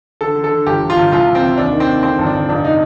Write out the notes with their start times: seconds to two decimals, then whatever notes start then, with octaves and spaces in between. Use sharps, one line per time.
0.21 D3 A4
0.35 D3
0.44 A4
0.51 D3
0.66 G1 G4
0.82 G1
0.90 F4
0.96 G1
1.12 C2 F4
1.27 C2
1.35 C4
1.42 C3
1.58 D#2 D4
1.73 D#3
1.80 C4
1.87 D#3
2.03 D3 C4
2.19 G1
2.26 D4
2.34 G1
2.48 F1 D4
2.65 D#4